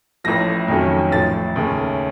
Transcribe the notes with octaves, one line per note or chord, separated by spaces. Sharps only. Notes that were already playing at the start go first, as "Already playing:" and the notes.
A1 A2 F3 A#6
F2 D#3 F#3 A3 C#4
A1 A2 F3 A6
D#2 C#3 A3 C#4